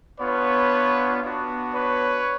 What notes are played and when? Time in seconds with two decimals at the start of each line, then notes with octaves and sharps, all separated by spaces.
0.18 B3 D4 F4 B4 C#5
1.21 B3 D4 F#4
1.73 B4 C#5